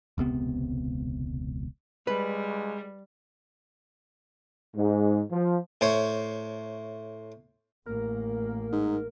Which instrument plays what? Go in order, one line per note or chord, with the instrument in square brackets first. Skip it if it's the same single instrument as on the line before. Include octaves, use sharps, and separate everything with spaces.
[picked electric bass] E1 C#2 C3 B3
[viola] G3 [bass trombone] G#3 [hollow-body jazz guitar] B4
[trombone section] G#2
F3
[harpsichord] A2 C5 C#5
[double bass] A1 A#3 [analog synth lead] A#4
[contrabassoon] G#2